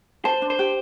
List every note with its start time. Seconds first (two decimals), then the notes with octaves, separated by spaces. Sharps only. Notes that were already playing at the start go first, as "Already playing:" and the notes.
0.25 C5 A5
0.42 D4
0.50 C5
0.59 G4